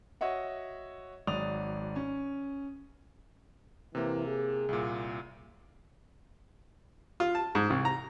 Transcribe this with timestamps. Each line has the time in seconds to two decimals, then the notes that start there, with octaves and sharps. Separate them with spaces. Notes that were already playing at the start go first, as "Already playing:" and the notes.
0.21 F#4 C#5 D#5 E5 F#5
1.27 G#1 F#3 D5 D#6 F7
1.96 C#4
3.95 C3 E3 A#3
4.27 G#4
4.69 C2 A#2
7.20 F4
7.35 A5
7.55 G#2
7.70 C2
7.85 A#5